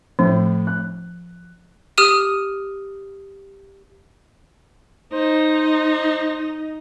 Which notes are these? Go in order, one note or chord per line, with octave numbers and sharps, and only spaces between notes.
A2 F3
F#6
G4 D#6 F6 D#7
D#4 C5